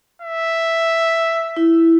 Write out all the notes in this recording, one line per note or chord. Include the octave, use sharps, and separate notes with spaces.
E5
E4